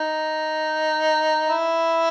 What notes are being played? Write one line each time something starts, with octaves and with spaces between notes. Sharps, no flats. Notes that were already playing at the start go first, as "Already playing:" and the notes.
Already playing: D#4
E4